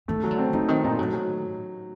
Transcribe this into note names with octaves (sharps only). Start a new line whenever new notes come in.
D#3 A3
F#3
D3
C4
D3 D#4
D#3 C4
A#2 D#4
A2 F#3
F#3